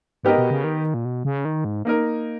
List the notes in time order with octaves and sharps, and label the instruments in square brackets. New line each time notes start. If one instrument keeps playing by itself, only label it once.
[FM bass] G#2 [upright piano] B3 G4 A#4 D#5
[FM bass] B2
C#3
D#3
A#2
B2
C#3
D#3
G#2
[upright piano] A#3 D#4 A#4